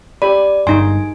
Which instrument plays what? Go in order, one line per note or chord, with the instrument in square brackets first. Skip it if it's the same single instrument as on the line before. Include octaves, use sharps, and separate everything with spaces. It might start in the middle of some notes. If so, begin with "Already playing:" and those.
[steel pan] G4 B5 [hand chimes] D5
[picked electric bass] G1 G2 [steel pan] D#4 C6 [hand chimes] G#5